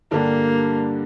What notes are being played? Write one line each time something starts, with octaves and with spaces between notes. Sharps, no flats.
G2 D3 G3 A#3 D4 G4